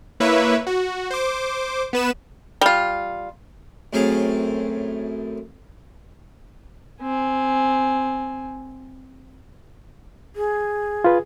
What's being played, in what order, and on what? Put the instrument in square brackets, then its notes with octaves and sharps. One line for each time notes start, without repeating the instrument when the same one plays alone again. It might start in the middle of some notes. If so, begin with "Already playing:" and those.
[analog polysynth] A#3 E4 B4 C#5 E5
F#4
C5 D6
B3 B4 E7
[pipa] G3 F4
[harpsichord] F#2 A2 C4 G#4 F5 A#5
[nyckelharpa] C4 G#5
[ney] G#4
[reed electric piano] F4 B4